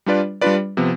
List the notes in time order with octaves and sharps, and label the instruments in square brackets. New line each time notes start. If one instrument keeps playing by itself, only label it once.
[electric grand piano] G3 D4 F4 B4 D5
G3 D4 F4 B4 D5
C3 F3 B3